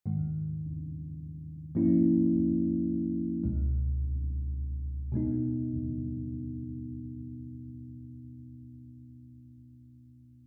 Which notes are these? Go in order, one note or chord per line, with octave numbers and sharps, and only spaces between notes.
G#2 D#3 G#3
G#2 F3 A#3 C#4 E4
C#2 B2 G#3
B2 G#3 B3 D#4